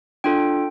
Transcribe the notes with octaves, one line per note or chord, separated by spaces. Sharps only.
D4 F4 A4 G5